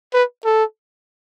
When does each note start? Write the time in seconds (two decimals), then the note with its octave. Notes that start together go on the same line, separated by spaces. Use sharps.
0.14 B4
0.45 A4